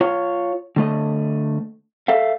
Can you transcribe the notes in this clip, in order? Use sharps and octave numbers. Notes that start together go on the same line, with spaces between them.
F4 C#5
D3 A3 D#5
A4 E5 F5